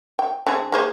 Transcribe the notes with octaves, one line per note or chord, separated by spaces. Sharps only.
G5
D3 C4 G#4
A#3 G#4 C5